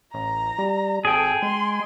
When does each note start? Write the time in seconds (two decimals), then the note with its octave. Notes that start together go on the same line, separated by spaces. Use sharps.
0.14 A1 A#5
0.59 G3
1.05 G#1 G#4 A4 G5
1.42 G#3 C6